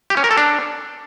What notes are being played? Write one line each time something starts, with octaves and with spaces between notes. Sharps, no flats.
G4
C#4
A#4
A4
D4